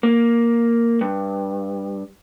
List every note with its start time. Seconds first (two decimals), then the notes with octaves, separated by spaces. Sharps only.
0.03 A#3
1.01 G2